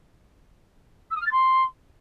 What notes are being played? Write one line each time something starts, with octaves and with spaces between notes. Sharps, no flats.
E6
D#6
F6
A6
C6